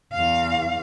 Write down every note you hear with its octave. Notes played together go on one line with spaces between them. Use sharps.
E2 F5